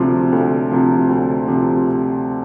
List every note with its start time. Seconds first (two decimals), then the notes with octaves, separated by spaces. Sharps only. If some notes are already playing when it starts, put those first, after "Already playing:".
Already playing: D2 C3 F3
0.32 D2
0.71 C3 F3
1.09 D2
1.48 C3 F3